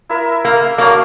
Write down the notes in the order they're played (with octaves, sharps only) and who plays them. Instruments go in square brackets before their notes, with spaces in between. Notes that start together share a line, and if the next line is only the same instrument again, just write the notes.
[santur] E4 A#4 E5
[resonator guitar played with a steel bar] A#3
[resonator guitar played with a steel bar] A#3 [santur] D4 F#4 C#5